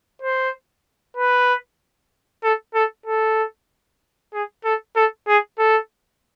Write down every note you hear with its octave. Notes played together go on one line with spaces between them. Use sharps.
C5
B4
A4
A4
A4
G#4
A4
A4
G#4
A4